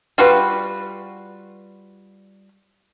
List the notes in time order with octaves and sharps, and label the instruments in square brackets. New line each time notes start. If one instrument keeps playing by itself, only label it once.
[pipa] G3 F4 F#4 B4